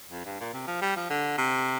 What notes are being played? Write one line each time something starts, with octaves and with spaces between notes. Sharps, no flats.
F2
G2
A#2
C3
F3
G3
F3
D3
C3